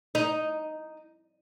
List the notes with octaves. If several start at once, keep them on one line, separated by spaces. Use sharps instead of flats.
D#4